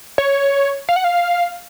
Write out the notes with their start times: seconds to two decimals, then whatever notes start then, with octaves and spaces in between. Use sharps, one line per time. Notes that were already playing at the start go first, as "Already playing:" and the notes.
0.18 C#5
0.89 F5
0.96 F#5
1.04 F5